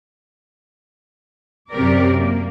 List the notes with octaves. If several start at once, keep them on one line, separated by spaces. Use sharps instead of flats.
F#2 C3 G4 A#4 D5
A#3